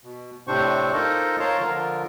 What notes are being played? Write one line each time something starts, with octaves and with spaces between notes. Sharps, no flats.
B2
A2 C3 C4 D4 C5 C#6
D#4 F4 A4 A#4 C5 D#5
A#4 C#5 F5 A5 A#5 C6
D3 F3 F4 A#4